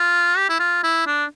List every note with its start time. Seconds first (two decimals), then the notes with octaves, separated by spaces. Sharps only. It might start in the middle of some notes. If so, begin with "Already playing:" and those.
Already playing: F4
0.37 G4
0.49 E4
0.59 F4
0.84 E4
1.06 D4